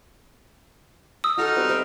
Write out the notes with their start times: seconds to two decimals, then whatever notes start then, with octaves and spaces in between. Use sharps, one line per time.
1.24 D#6 E6
1.38 D#4 F#4 A4 A#5 F6
1.56 G3 C4 B4
1.69 C5 E5 G5